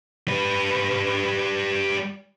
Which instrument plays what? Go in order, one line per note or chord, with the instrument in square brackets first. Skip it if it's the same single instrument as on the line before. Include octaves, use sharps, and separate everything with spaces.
[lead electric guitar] G3 B4